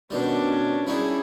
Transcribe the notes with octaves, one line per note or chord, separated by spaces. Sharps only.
B2 D#3 G3 C#4 D4
G3 C#4 D#4 E4 G#4